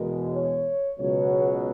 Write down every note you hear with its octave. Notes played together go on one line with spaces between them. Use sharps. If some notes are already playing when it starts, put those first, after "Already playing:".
Already playing: E2 B2 G#3 A#4
C#5
C#2 B2 F#3 C#5